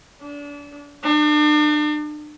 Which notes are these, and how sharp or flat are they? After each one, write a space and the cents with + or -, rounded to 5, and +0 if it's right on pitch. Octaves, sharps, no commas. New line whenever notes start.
D4 -30
D4 +40